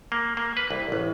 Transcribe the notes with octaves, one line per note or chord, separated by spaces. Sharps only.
A#3
A#3
B4
C2
A1